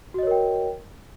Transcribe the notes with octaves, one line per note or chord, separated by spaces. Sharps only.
F#4 A#4 C#5 D#5 G5